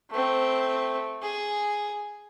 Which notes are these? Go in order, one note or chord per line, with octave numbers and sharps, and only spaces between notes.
A3 C4
G#4